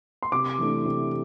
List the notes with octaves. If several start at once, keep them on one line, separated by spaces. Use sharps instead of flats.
C6
C3 D6
E3 A3 D4
C3